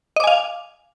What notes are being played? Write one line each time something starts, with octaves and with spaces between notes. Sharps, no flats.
D#5 F5 G#5 D6